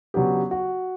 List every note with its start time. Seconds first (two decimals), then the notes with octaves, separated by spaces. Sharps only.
0.14 C#3 F#3 B3 D4 G4
0.51 F#4